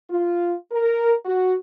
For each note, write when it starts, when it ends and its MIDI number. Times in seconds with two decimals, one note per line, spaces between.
0.10 0.53 65
0.72 1.15 70
1.26 1.55 66